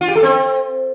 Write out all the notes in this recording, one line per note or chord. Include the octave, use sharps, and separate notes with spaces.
F4
G4
A4
C4